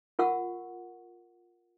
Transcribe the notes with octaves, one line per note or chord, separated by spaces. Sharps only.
F4 A#4 F#5 C#6 E6